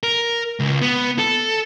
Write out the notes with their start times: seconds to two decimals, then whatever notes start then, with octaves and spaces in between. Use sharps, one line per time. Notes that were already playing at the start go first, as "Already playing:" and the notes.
0.03 A#4
0.60 C#2
0.82 B3
1.18 A4